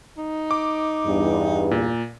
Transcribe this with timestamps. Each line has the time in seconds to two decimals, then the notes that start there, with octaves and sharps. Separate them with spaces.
0.18 D#4
0.51 D6
1.06 E2 G2
1.71 A#2